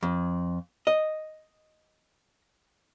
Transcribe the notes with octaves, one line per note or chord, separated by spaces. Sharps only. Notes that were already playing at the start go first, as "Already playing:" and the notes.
F2
D#5